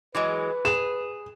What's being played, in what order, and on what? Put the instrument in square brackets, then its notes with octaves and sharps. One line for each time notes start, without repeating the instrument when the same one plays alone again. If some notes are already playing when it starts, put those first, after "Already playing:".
[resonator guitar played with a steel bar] E3 F#3 G#3 [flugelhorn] B4
[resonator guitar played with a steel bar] G#4 [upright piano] E7